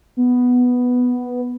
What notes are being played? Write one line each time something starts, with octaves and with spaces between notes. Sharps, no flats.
B3